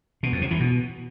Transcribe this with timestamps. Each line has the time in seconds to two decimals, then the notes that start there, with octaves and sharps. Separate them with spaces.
0.23 B2
0.32 F2
0.42 C3
0.51 E3
0.60 B2